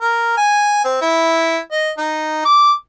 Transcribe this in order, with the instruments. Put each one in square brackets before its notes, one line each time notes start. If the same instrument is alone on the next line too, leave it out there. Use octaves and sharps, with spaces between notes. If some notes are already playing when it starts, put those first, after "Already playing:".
[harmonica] A#4
G#5
C4
E4
D#5
D#4
D6